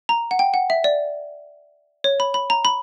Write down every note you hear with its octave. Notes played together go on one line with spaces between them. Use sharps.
A#5
F#5
G5
F#5
E5
D5
C#5
B5
B5
A#5
B5